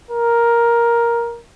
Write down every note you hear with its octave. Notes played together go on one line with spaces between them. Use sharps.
A#4